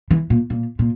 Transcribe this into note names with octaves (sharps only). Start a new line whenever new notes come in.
E3
A#2
A#2
A#2